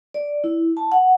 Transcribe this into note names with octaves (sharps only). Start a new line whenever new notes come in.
D5
E4
A5
F#5